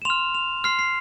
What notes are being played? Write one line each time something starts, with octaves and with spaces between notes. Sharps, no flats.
E7
C6 F6 F7
F7
C6 F6 C7
C7